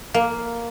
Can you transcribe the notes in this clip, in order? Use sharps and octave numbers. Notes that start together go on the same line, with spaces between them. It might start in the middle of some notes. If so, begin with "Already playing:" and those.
A#3